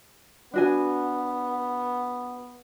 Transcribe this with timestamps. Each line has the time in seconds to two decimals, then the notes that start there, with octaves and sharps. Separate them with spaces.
0.54 B3 D4 F#4 G#5